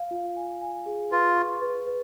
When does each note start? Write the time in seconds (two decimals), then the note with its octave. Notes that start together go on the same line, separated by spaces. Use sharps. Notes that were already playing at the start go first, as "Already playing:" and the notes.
Already playing: F5
0.11 F4
0.36 G#5
0.61 G#5
0.86 G#4
1.11 F4 B4
1.36 C#6
1.61 B4
1.86 B4